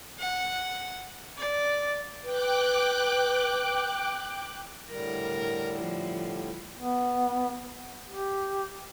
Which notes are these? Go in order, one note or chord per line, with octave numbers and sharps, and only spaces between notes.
F#5
D5
B4 G5 D6 F#6
A2 D3 G3 A#4
F3
B3
G4